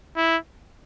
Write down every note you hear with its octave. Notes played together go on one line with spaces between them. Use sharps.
E4